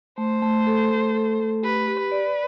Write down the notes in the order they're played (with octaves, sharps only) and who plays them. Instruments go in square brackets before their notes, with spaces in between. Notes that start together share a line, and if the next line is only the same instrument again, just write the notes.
[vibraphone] A3 [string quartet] C5
[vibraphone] A3
A4
A3
A4
A3
[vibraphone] G4 [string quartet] B4
[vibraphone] G4
[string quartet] B4
[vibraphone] D5